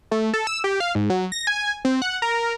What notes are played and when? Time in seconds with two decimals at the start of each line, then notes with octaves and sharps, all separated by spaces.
0.11 A3
0.34 A4
0.47 E6
0.64 G4
0.80 F5
0.95 G#2
1.10 F#3
1.32 A#6
1.47 G#5
1.85 C4
2.02 F#5
2.22 A#4